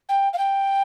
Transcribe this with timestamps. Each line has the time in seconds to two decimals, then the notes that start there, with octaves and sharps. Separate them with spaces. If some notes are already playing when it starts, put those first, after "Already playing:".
0.09 G5
0.33 F5
0.38 G5